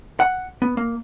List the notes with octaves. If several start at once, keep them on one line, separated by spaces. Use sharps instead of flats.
F#5
B3
A#3